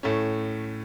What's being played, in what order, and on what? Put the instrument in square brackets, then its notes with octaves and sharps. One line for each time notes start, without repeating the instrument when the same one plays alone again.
[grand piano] A2 A3 C#4